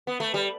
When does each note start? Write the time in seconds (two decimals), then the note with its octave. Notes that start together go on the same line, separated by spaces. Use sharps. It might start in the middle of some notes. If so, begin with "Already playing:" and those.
0.07 B3
0.20 A3
0.34 G3